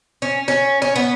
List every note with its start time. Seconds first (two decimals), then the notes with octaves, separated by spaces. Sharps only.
0.22 C#4
0.48 C#4
0.82 C#4
0.96 B3